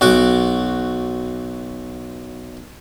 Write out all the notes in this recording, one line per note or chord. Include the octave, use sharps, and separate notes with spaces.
B1 F#4 D6